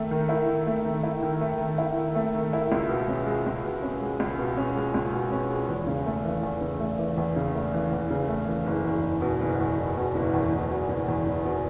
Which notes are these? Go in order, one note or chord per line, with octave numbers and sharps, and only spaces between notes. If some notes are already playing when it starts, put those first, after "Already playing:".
Already playing: D#3 A3
D#3
E4
D#3
A3
D#3
E4
D#3
A3
D#3
E4
D#3
A3
D#3
E4
C#2
B2
C#4
G#3
C#2
B2
C#4
G#3
C#2
B2
C#4
G#3
C#2
B2
C#4
G#3
E2
C#3
A3
E3
E2
C#3
A3
E3
E2
C#3
A3
E3
E2
C#3
A3
E3
F#1
E2
F#1
B2
F#1
E2
F#1
B2
F#1
E2
F#1
B2
F#1
E2
F#1
B2